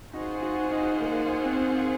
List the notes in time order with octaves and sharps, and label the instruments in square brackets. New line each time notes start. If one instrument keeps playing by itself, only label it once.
[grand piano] D#4 F#4 [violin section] F4 G#4 C5 F#5
[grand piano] D#4 F#4
D#4 F#4
A#3
C4